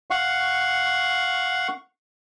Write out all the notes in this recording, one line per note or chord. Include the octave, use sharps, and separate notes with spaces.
F5 F#5 C#6